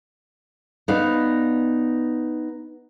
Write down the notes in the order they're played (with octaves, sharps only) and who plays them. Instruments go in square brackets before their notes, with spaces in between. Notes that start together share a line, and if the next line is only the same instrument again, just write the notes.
[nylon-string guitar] B3 D#4 D5 F5